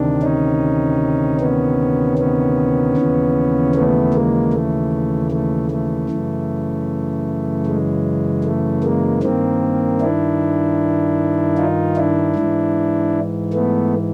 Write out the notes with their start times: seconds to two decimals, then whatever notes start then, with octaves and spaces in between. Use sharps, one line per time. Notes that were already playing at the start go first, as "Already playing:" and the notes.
Already playing: D2 C3 D#3 D4
0.22 C#4 D#4
1.40 B3 C#4
2.18 B3 C#4
2.97 D#2 C#3 E3
3.75 A3 B3
4.14 G#3 A#3
4.53 A3
5.31 A3
5.71 A3
6.10 F#2 C#3 E3
7.66 G#3
8.44 A3
8.83 G#3 A#3
9.23 G2 D#3 A#3 C4
10.01 D4 E4
11.58 D#4 F4
11.97 D4 E4
12.36 G#2 E3
13.53 A3 B3